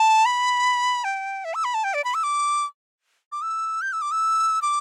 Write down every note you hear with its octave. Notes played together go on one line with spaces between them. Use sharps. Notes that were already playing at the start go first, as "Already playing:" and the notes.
Already playing: A5
B5
G5
E5
E6
B5
A5
G5
D5
B5
E6
D6
D6
E6
G6
E6
D6
E6
D6